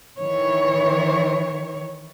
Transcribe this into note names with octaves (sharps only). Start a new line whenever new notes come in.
D#3 E3 C#5